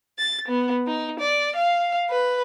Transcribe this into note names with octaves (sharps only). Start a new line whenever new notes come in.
A6
B3
D#4
D5
F5
B4